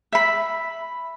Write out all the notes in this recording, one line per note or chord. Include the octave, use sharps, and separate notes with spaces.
E5 B5